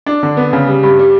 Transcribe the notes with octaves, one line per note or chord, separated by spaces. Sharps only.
D4
D3
B3
C#3
G3
G2
G3